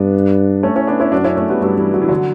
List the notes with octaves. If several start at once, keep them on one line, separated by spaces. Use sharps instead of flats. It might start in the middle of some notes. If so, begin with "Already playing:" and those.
Already playing: G2 B3 D4
A3 C#4
C#4 E4
B3 D4
C#4 E4
F#2 D4 F#4
C#4 E4
A3 C#4
G3 B3
G2 F#3 A3
E3 G3
F#3
E3
D3 F#3